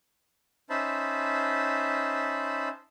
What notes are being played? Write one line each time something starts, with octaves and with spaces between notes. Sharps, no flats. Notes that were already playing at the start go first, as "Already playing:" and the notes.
C#4 D#4 C5 E5 A5 B5